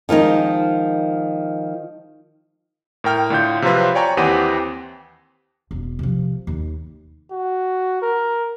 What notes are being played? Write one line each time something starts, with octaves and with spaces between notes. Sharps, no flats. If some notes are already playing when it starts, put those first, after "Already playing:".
D#3 F3 G#3 D#4
A2 A#4 G5 F6
A2 D3 F4 G6
C3 F3 F#3 C4 F4 B4
C#5 D5 G5 G#5 A#5 C#6
D#2 E3 C4 G4 F#5 D#7
E1
C3 F3
D#2
F#4
A#4